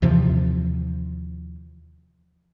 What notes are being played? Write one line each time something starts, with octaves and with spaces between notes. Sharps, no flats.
D#2 C3 E3 F3